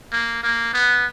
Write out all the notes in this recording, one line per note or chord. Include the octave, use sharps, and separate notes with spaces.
A#3
A#3
B3